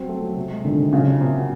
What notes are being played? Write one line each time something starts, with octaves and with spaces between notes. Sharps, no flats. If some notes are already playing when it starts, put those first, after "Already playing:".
Already playing: F#3 C4
A3
F#3
C3
G#3
D3 D#3
C3
C#3 F#3
D4
C3 A#3
F#4